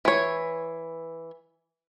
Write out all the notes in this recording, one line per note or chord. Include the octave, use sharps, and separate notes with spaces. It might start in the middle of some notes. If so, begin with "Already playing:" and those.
E3 C#5